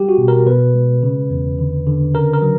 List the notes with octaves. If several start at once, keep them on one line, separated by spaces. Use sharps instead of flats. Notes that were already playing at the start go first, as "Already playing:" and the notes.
Already playing: G3 G4
F#4
B2
A#4
B2 B4
G#3
C#3
E2
D3
D3
C#3 A#4
A#4
F#3